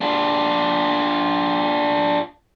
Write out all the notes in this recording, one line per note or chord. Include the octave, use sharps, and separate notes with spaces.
D4 F4